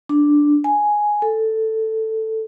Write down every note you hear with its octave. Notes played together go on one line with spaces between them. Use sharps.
D4
G#5
A4